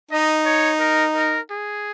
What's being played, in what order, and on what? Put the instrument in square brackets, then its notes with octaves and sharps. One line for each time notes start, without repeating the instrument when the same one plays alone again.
[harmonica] D#4 [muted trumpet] D#5
[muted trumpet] C#5
A#4
A#4
G#4